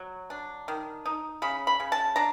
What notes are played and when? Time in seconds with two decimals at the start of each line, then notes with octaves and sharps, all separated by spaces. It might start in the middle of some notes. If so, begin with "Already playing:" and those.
Already playing: F#3
0.30 D4
0.68 D#3
1.06 D#4
1.42 C#3 B5
1.67 B5
1.80 C#3
1.92 A5
2.16 D4 A#5